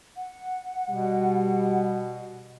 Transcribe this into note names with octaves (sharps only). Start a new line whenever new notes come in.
F#5
B2 G3